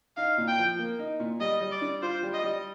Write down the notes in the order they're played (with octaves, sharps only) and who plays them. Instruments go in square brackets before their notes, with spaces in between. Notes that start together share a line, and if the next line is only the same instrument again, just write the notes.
[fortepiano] D#4 [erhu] F5
[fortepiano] A#2
[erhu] G5
[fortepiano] F3
A#3
D#4
A#2
[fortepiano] G3 [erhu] D#5
[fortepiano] G3
[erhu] D5
[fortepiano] D4
[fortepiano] F4 [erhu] C5
[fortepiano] G3
[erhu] D#5
[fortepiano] G3